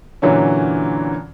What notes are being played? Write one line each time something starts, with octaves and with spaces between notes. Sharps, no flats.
A#2 D3 E3 F#3 C#4